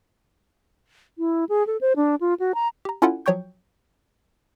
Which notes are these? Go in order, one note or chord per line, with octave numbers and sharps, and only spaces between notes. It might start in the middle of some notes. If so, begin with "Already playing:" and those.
E4
G#4
A4
C5
D4
F4
F#4
A#5
G4 A#5
C#4 E4 F4 A4 F#5 G#5
F3 F#3 C#5 G5 C#6 G6